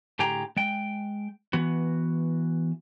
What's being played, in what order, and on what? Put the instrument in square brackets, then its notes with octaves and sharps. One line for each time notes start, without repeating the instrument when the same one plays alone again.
[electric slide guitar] A2 D3 G4 G#4 G5 A#5
G#3 G5
E3 B3 F#4